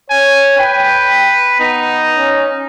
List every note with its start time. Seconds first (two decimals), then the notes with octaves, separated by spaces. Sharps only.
0.10 C#5 G#5
0.59 B4 G5
1.60 B3 D#4
2.17 C#4